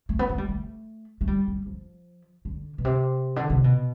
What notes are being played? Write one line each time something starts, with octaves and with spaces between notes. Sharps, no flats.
A3
B3
A3
G3
A3
A3
G3
G3
F3
D3
B2
C3
D3
C3
B2